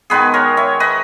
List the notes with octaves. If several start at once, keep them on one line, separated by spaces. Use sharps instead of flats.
D#3 G#3 B3 G#4 B4
A#4 C#5
C#5 E5
B4 D#5